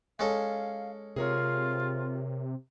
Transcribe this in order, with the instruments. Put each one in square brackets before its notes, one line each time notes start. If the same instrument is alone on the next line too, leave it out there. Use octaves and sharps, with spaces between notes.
[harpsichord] G#3 C#4 A4 [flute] F5
[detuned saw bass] C3 [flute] F4 [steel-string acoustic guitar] G#4 A#4 C#5